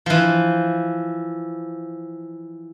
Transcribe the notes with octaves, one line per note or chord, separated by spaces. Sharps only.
E3 F3